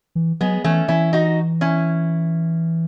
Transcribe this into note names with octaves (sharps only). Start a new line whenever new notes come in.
E3
F#3 G#3 B3
E3 A3 C#4
E3 C#4 E4
D#4 F#4
C#4 E4